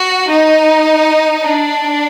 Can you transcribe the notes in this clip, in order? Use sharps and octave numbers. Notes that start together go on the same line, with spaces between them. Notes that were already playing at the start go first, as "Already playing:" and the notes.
Already playing: F#4
D#4
D4